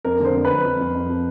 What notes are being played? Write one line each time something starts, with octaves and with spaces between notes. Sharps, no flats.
F2 A#4
D3 C5
F2
B4
F2
F2
F2
F2
F3